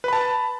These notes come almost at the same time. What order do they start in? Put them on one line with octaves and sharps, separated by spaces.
B4 B5 A5